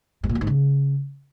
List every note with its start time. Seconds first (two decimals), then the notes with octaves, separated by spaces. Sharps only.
0.24 G#2
0.29 A#2
0.35 F#3
0.41 G#2
0.47 C#3